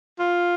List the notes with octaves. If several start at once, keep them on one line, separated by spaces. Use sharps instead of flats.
F4